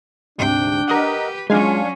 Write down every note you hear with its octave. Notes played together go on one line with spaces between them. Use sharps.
D2 G#2 C3 D4 G5
G4 A#4 B4 D#5 F#5
F#3 G#3 C#4 D4 F4 F5 G#5